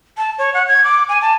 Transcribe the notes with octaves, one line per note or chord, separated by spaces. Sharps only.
A5
C#5
F#5
G#6
D6
G#5
A5